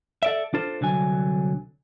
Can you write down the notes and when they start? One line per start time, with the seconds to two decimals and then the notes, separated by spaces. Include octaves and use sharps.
0.23 A4 D5 E5
0.54 D4 F4 A4 C5
0.81 C2 D3 F#3 G#5